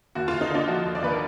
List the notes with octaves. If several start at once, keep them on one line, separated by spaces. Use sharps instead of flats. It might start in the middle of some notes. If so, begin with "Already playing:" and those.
D#2 F#4
F4
D#2
D#4
D3 D4 F4
F3 D#4 F#4
D#2
D5
D#2 B4
A#4